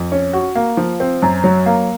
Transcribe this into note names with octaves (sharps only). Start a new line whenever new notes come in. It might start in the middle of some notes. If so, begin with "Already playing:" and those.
Already playing: F2
C#4
F#4
A#3
F3
C4
F#2
F#3
A#3